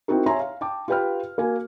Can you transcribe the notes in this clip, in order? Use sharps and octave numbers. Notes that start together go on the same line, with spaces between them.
C4 D#4 E4 F#4 A#4
C#5 E5 G#5 A#5 C6
F5
G5 A5 D6
F4 G4 B4 G5 B5 F6
A#3 F#4 G#5